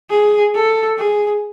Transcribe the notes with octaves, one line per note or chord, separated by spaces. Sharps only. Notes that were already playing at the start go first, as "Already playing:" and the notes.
G#4
A4
G#4